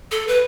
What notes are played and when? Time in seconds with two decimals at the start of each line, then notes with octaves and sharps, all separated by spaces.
0.11 A4
0.28 B4